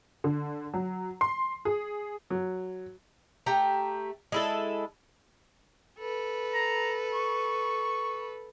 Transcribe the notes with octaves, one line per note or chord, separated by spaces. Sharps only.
D3
F#3
C6
G#4
F#3
A3 G4 A#5
G#3 E4 A4
A4 B4
A#5
C#6